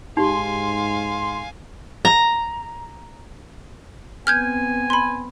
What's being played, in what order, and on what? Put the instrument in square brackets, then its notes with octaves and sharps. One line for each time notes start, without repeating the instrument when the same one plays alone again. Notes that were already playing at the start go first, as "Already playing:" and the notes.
[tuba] G#2 [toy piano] D#4 G4 [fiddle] F5 G#5 [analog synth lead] C6
[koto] A#5
[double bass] B3 C4 [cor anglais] G#5 [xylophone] F6 G6 G#6
[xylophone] B5 C6